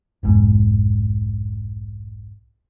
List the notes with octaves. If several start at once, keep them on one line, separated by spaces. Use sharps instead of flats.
F1 B1 G#2